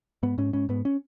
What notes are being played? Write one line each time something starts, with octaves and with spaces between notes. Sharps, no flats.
G#2 B3
G#2 C#4
G#2 C#4
G#2 B3
C#4